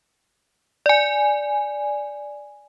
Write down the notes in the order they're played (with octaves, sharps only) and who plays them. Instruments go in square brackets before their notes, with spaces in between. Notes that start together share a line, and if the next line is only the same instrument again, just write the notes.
[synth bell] D5 G#5